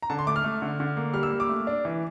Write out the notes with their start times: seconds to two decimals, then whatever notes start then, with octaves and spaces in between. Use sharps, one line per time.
0.02 A#5
0.10 D3 A5
0.19 C6
0.27 A3 D6
0.36 F6
0.44 A3
0.62 D3
0.80 D3
0.97 A#3
1.14 G3 F6
1.23 E6
1.32 A#3
1.40 D6
1.49 A3
1.67 D4
1.85 E3